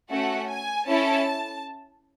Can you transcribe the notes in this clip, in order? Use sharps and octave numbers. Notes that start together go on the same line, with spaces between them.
A3 C#4 F#4 A4 F#5
G#5
C#4 E4 A4 A5